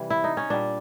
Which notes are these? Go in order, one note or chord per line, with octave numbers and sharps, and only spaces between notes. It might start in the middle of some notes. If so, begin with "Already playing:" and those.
Already playing: C3 E3 G3
E4
D#4
C#4
A#2 G3 D4